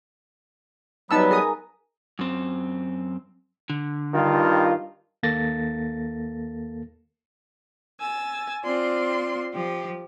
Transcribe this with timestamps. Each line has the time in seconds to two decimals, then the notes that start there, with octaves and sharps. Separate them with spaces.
1.11 F#3 G3 B3 D#4 B4 A5 E6
1.31 G#4 A#4 G#5 A#5 D#6
2.19 F#2 C4
3.70 D3
4.14 G2 D#3 F4
5.23 D#2 A#3 A4 A6 A#6
7.99 G#5 E6 A6
8.63 C4 F4 D5 C6
9.52 F3 G4